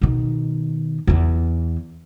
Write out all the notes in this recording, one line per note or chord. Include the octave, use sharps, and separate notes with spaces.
B2 D#3
E2 E3